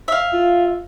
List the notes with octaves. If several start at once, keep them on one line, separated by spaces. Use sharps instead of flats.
E5 F5
F4